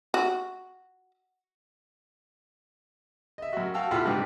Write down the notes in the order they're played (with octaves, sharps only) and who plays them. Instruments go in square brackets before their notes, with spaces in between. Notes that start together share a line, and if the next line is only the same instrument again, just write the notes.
[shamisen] F#4
[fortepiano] D#5 E5
F#2 F#4
F#4 F5 G5 A5 E6
B2 E4 F4 G4 A4 F#5
G#2 C3 G3 D4 G4 B4